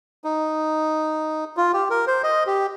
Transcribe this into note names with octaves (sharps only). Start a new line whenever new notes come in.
D#4
F4
G4
A#4
C5
D#5
G4